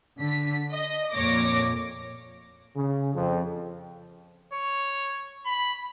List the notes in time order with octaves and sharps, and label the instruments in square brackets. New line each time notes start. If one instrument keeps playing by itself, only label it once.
[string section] D3 B6
D#5
F2 A#2 C#5 D6 A#6
[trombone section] C#3
F2
[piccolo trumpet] C#5
B5